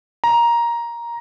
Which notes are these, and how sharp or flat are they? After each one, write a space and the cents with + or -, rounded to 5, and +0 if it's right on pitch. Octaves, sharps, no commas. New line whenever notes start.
A#5 +10